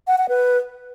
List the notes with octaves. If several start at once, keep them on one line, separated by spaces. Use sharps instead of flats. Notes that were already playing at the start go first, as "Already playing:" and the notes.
F#5
F#5
B4